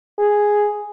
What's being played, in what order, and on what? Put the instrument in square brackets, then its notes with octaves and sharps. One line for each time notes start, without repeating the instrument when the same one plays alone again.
[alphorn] G#4